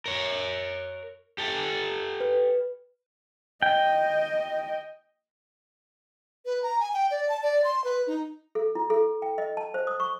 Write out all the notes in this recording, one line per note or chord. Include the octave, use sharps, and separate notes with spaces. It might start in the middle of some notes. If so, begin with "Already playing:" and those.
A#4 C#5
G4 A4
B4
D#5 G5
B4
A#5
G#5
G5
D5
A5
D5
C6
B4
D#4
A4
E4
A4
G5
D#5
A5
C5
D#6
C#6